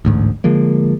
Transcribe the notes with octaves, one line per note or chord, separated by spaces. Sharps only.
A1 D2 G#2
D3 F3 G#3 A#3